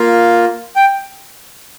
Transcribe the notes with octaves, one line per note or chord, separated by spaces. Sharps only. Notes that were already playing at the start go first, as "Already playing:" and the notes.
Already playing: A#3 F4
G5